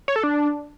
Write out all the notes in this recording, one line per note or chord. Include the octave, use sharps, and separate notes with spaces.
C#5
A4
D4